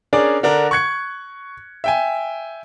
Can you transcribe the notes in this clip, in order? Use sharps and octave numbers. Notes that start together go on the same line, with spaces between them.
C#4 D4 G#4 A#4 D5
D3 D4 A#4
C#6 F#6 G#6 C#7
E5 G5 G#5